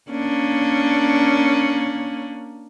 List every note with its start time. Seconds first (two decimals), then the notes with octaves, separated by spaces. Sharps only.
0.10 A#3 C#4 D4